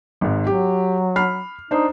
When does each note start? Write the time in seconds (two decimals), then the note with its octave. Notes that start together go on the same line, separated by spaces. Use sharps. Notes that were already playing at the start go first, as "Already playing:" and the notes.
0.21 G#1 G#2
0.47 F#3 G4
1.16 B5 F6 C7
1.71 D4 D#4 C5